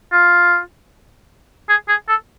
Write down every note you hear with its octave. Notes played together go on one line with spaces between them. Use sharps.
F4
G#4
G#4
A4